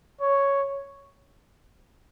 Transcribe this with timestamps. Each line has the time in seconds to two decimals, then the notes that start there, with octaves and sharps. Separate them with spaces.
0.21 C#5